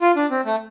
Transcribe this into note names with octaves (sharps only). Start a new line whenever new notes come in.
F4
D4
C4
A3